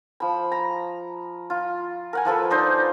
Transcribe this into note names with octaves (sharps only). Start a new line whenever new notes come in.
F3 B5
A#5
F4
A#4 F#5 G#5
F3 F4 A4 B4
D4 D#4 C5